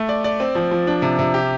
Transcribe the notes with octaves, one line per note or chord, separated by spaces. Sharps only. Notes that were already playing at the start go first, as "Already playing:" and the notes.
Already playing: A3
D5
D5
C4
F3
F3
D4
C3
C3
G4